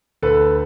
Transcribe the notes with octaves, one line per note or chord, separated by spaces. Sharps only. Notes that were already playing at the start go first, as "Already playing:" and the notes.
D2 A4 B4